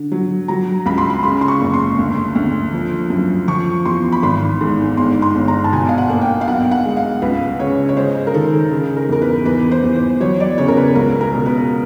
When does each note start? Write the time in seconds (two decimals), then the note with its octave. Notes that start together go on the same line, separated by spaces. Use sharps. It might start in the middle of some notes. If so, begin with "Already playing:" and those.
Already playing: D3
0.12 F#3
0.48 F#3 A#5
0.86 C#2 B5
0.98 C6
1.10 B5
1.23 C#3 C6
1.41 C6
1.48 C#6
1.62 F#1
1.74 C6
1.99 D2
2.35 D2
2.73 F3
3.10 F#2
3.48 F3 C#6
3.86 E2 C6
4.12 B5
4.23 G#1 C6
4.61 G#2
4.97 G1 C6
5.22 C6
5.35 G1
5.48 A#5
5.64 A5
5.72 B2 G#5
5.89 F5
5.98 F#5
6.10 A#3
6.22 G5
6.41 F5
6.47 B1 F#5
6.71 F#5
6.85 G#3
6.97 F5
7.22 C#2 B4
7.59 C#3 C#5
7.89 C#5
7.97 G#3 C5
8.27 A#4
8.34 D#3 A4
8.72 C#3
8.97 A#4
9.09 E2 A#4
9.22 B4
9.46 E2 B4
9.71 C5
9.84 E2
9.95 C5
10.20 F#3 C#5
10.40 D5
10.58 C#3 C#5
10.68 A#4
10.77 B4
10.95 C#2 A#4
11.21 A#4
11.34 B2
11.46 B4